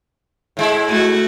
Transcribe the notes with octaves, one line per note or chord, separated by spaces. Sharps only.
A2 G#3 E4
A3 F#4